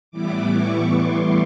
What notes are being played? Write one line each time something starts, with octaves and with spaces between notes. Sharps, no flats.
A2 E3 G3 B3 E4 D6
C#6
C6